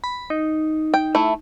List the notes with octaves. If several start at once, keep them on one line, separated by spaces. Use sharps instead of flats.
B5
D#4
G5
A3 E4